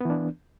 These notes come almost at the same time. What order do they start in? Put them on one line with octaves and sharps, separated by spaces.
B3 E3 D4